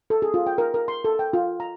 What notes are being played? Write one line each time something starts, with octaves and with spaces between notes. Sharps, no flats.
A4
G#4
F4
G5
A#4
A#4
C6
A4
G5
F4
A#5